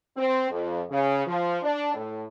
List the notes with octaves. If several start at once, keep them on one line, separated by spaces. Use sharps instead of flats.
C4
F2
C#3
F3
D4
A2